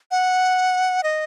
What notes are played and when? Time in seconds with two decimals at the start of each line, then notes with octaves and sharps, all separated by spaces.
0.11 F#5
1.03 D#5